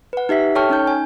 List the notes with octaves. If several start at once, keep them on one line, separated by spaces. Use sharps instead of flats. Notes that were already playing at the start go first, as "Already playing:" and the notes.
B4 F#5
D#4 G4 E5 B6
A4 C#5 G5 A5 C#6 F6
C#4 D#4 G6
G#5